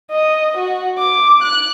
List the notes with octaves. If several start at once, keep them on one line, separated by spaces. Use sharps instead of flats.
D#5
F#4
D6
F#6